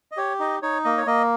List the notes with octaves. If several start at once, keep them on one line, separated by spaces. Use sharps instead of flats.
D#5
G4 C#5
D#4 D#5
D#4 C#5
A#3 D#5
C#5
A#3 D#5